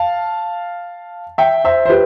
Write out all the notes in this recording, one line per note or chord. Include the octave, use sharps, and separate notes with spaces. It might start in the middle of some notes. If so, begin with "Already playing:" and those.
Already playing: F5 A5
E5 G5
C5 E5
C5
G4 B4